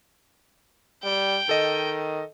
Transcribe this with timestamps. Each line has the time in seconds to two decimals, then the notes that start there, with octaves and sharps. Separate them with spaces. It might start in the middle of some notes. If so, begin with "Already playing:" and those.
1.04 G3 G5
1.49 D#3 A4 D#5